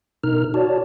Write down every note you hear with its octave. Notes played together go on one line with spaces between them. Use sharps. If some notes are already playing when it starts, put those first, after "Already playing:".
B2 D#4 A#4 F6
F#4 C#5 D5 A5